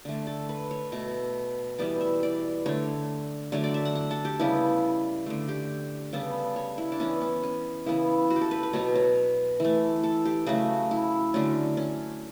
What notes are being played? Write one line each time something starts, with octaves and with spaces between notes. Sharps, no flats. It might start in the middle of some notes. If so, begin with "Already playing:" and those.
D3 A3
A4
B4
C#5
B2 A3
E3 G3 B3 D5
E5
D5
D3 A3 C#5
D3 F#3 A3 C#5
D5
E5
F#5
F#5
A4
G4
C#3 G3 B3 E4
D3 A3
G4
C#3 G3 B3 A4
C#5
E4
D4
E3 B3 C#4
B3
C#4
C#3 E3 B3 E4
F#4
G4
A4
B4
B4
B2 F#3 B3 C#5
C#5
E3 A3
A4
G4
C#3 F#3 A3 F#4
E4
D3 F#3 A3 C#4
C#4